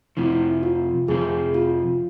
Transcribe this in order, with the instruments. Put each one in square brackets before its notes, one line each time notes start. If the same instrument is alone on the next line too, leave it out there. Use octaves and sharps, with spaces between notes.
[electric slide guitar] F2 C3 F3 [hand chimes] E4
[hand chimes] F4
[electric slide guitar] F2 C3 F3 [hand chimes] G#4
[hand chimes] F4